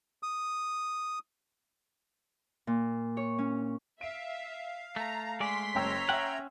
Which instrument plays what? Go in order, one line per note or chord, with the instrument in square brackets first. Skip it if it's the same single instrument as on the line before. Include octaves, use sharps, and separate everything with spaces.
[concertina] D#6
[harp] A#2
C#5
C#4
[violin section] E5 [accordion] F5 [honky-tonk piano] D7
[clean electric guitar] A3 [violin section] A#5
[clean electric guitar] G#3 A3 D5 [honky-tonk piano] G#5 [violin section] C6 B6
[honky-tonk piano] F#1 G5 E6 [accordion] C#5 A#5
[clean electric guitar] C#4 F#5 [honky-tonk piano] E5 G5